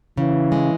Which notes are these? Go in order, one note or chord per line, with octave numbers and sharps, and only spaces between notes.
C#3 E3
G#3